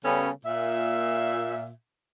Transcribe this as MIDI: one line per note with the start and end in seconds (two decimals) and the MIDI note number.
0.04 0.30 49
0.04 0.30 55
0.04 0.30 59
0.04 0.30 61
0.04 0.30 69
0.45 1.69 46
0.45 1.69 76